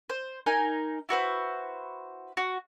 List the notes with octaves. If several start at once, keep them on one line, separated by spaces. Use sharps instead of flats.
C5
D#4 A#4 G#5
E4 F#4 B4 C5
F#4